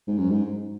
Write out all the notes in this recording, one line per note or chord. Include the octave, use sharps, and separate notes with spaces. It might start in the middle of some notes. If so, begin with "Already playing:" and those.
G#2
F#2
G#2